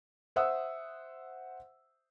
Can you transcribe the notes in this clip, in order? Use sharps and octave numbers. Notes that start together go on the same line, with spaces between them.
C5 E5 F#5 D#6 E6